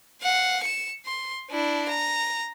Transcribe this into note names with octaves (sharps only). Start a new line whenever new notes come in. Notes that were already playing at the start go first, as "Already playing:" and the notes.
F5 F#5
C#7 E7
C6
D4 E4
A#5